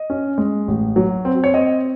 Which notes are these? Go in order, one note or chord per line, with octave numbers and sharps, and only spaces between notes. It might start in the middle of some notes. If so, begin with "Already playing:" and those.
Already playing: D#5
C#4
G#3
A1
F#3
C4
C#5
C4 D#5